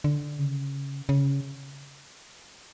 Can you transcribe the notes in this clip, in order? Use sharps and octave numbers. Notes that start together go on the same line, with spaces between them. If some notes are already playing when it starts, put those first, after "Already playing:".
D3
C#3
C#3